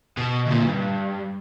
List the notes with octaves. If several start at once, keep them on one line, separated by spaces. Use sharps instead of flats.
B2
D2 A#2
G2